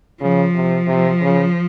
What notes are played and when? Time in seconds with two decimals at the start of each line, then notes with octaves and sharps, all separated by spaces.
0.21 C#3 F3
0.54 C3
0.87 C3
1.21 C#3